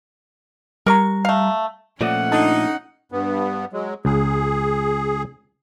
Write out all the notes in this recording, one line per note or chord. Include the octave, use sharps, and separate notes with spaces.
G3 A#4 A#5 C#6
A3 F5
A#2 F3 A3 C#4 D5 D#5 F#5
D4 D#4 A4 A5
G2 B3
F#3 G#3
C#2 G#4